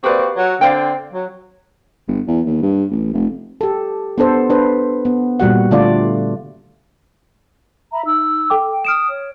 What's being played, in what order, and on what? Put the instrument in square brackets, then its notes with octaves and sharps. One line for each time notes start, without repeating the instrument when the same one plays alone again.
[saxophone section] A#3 C4 F#4 [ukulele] G4 B4 D5
[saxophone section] F#3
[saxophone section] D3 C4 [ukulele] D5 F5 G5
[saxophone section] F#3
[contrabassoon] G1
E2
D#2
G2
A1
F1
[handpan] G4 A4
B3 D4 A4 C5
D4 B4 C5
B3
A#2 G3 F#4 F#5
D3 A3 D4 F4 D5
[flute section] E5 A#5 B5
D#4 E6
[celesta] A4 G5 D6
[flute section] G5
[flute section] D#6 [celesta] F6 D7 E7
[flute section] C#5